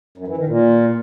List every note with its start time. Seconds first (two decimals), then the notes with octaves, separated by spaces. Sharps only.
0.18 F#2
0.27 E3
0.37 D#3
0.47 A#2